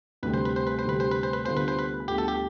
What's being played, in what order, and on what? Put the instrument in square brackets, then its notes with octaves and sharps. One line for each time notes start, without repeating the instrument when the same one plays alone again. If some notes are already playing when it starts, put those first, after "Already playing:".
[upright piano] D2 C3 G3 [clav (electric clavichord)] B4
[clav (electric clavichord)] C5
B4
C5
B4
C5
[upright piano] D2 C3 G3 [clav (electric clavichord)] B4
[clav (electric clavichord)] C5
B4
C5
B4
[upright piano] D2 D3 G3 B3 F4 [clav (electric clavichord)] C5
[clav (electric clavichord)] B4
C5
B4
[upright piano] D2 D3 G3 B3 F4 [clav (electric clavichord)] G4
[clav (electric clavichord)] A4
G4